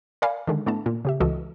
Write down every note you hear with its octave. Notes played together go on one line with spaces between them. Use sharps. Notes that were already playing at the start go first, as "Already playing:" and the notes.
A#4 D5 F5 G#5 B5
D3 D#3 G#3
A2 A3 B3 D4 A5
A#2
C#3 G4 E5
C#2 E3 F#4 A4 D#5